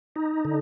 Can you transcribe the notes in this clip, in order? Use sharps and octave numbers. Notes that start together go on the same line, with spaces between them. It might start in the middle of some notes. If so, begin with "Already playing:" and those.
D#4
D3